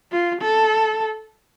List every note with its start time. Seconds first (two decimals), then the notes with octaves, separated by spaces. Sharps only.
0.12 F4
0.42 A4